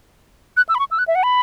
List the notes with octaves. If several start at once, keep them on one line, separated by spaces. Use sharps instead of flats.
F#6
E6
B5
C#6
E6
F#6
E5
F#5
B5